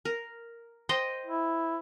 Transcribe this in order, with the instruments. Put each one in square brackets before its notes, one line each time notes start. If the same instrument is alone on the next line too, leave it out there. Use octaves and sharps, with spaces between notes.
[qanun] A#4
C5 D#5 G5
[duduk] E4